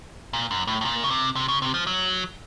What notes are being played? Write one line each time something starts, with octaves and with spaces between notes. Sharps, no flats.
A#2
F#2
A2
A2
A#2
C#3
C3
C3
C#3
C3
F3
F#3